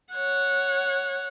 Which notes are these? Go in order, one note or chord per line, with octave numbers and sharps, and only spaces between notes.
C#5 F#5